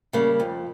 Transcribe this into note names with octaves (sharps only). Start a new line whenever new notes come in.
C#3 G3 A#3
F2